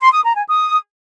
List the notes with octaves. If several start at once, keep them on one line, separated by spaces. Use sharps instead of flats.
C6
D#6
A#5
G#5
D#6